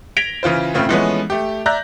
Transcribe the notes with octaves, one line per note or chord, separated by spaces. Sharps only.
G#6 A#6 B6 D7 F7 G7
C#3 E3 F4 C5
A2 C#3 A3 C4 E4 F4
E3 F3 G#3 A3 B3 C#4
A3 G4
D5 E5 A#5 F#6 G6 A#6